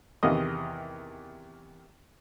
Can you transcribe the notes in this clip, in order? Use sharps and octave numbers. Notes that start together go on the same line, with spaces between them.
E2 C3 D#3 D#5 D#6